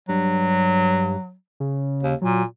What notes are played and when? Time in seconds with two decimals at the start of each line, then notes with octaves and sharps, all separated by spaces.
0.09 G2 F#3
1.60 C#3
2.03 D#2
2.21 A#2 F#3